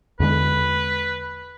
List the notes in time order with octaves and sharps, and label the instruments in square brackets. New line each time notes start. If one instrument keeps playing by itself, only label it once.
[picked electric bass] E2 D3 G#3 [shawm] B4